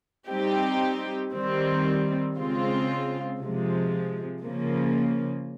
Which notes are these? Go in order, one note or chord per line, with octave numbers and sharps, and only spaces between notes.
G3 C4 D#4 G4
D#3 G3 C4
C#3 G#3 C4 F4
C3 F3 G#3
C#3 F3 A#3